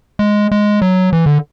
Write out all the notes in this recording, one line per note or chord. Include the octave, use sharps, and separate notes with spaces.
G#3
G#3
F#3
E3
D3